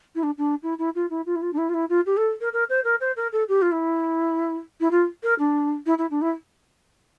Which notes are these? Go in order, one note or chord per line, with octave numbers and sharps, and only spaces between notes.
E4
D4
D4
E4
E4
F4
E4
F4
E4
F4
D4
E4
F4
E4
F4
G4
A4
A#4
A#4
C5
A#4
C5
A#4
A4
G4
F4
E4
E4
F4
A#4
D4
E4
E4
D4
E4